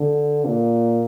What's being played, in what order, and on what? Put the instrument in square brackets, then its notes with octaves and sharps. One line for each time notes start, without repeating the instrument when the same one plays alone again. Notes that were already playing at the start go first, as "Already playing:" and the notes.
Already playing: [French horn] D3
A#2